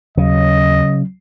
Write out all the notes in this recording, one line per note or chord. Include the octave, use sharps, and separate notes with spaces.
D#2 C#3 F#3 D#5